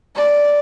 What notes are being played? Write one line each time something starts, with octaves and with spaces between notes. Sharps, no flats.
D5